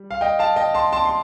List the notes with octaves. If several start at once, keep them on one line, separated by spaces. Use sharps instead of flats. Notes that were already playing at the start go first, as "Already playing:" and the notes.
Already playing: G3
F5
D#5 G5
F5 A5
D#5 G5
A5 C6
A5 C6
C6